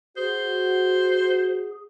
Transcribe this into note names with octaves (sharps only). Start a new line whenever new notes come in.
F#4 G#4 C5